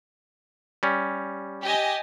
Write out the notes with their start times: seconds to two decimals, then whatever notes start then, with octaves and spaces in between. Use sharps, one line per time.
0.83 G3 C#4
1.63 G4 D#5 G#5